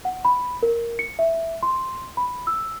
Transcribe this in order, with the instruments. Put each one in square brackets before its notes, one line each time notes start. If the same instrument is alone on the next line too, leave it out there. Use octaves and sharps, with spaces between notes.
[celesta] F#5
B5
A#4
C#7
E5
C6
B5
E6